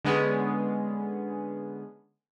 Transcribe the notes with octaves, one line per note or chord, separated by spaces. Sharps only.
D3 G#3 B3 C#4 G#4